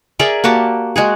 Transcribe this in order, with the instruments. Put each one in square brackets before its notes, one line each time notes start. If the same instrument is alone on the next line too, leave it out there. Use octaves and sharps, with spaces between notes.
[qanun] G#4 A#4 D5 E5
A#3 F#4 G4 A5
G#3 F#4 G#4